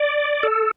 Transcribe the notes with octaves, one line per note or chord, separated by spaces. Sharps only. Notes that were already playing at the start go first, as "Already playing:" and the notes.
Already playing: D5
A4